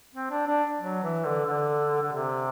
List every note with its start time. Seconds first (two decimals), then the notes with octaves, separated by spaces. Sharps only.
0.14 C4
0.31 D4
0.47 D4
0.80 F#3
1.03 E3
1.25 D3
1.46 D3
2.02 D3
2.12 C3